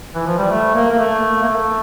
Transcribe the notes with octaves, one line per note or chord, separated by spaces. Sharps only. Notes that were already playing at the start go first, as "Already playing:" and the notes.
E3
F3
G3
A3
A#3
A#3
A3
A#3
A3